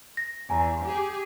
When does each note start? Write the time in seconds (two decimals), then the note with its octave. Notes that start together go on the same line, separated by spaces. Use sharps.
0.17 A#6
0.50 E2 G#5 A#5
0.85 G4 G#4